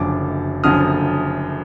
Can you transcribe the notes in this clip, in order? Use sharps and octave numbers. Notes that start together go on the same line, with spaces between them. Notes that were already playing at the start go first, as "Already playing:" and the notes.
Already playing: F#1 F#2 D3 F3 D6
F#1 F#2 D3 F3 D#6 F6